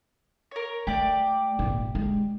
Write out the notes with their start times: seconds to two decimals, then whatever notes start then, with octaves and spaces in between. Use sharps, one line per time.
0.51 A#4 C#5
0.87 A3 G4 D5
1.59 G#1 A#2
1.95 G#3